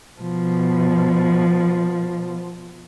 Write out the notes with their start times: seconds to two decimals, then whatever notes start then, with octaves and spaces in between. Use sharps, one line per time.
0.21 B2 F3